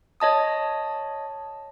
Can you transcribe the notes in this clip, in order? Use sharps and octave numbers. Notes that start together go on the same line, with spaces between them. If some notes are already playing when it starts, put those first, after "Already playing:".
C#5 D#5 A5 D#6